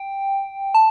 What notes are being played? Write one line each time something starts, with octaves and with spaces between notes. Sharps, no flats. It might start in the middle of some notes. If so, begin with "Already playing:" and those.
Already playing: G5
A5